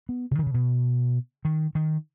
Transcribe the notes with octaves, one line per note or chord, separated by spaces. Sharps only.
B3
C#3
D#3
C#3
B2
D#3
D#3